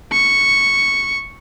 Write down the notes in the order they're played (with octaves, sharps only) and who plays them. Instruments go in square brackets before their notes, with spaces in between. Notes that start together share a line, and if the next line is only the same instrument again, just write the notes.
[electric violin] C#6